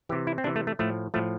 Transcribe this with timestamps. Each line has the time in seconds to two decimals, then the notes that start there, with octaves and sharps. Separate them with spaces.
0.09 E3 G4
0.12 C3
0.27 E4
0.38 C4
0.44 C3 E3 D4
0.56 A3
0.67 A3
0.79 A2 F3 A3
1.14 A2 F3 A3